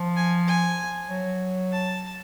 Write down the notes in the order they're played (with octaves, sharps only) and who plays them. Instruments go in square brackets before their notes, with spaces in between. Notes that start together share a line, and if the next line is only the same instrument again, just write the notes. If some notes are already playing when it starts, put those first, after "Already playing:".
Already playing: [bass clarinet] F3
[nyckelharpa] G#5
G#5
[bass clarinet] F#3
[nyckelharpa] A5